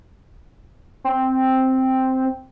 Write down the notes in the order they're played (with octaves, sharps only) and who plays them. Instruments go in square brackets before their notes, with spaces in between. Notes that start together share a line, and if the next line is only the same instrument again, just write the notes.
[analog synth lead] C4